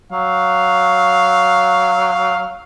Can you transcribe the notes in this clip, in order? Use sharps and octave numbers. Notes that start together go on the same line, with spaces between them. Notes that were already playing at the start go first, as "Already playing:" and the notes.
F#3 F5